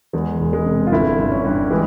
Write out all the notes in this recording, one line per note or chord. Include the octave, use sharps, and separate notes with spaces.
E2 G#3
E1
G#3
C3
F4
G1 E4
G1
C#4
G2
E3 G#3